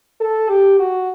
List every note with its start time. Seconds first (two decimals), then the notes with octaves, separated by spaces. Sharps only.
0.21 A4
0.49 G4
0.79 F#4